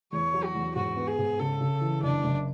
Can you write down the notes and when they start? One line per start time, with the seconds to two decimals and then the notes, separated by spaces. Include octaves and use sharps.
0.12 E2 C#5
0.34 F#3
0.44 F#4
0.55 E2
0.75 G#2 F#4
0.96 B3
1.07 G#4
1.18 G#2
1.39 C#3 A4
1.61 C#3
1.81 E3
2.02 F#1 D4
2.24 F#1